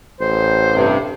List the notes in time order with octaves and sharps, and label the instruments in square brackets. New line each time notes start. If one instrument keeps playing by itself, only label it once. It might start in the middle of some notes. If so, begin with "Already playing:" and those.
[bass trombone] A1 [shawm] C5
[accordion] G2 C3